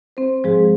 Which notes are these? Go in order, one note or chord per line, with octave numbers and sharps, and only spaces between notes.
C4 C5
G#2 F3 G#3 G#4